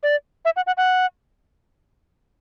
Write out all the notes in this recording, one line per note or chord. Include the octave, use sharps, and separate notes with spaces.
D5
E5
F#5
F#5
F#5